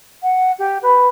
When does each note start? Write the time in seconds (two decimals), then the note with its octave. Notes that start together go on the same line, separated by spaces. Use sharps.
0.22 F#5
0.59 G4
0.82 B4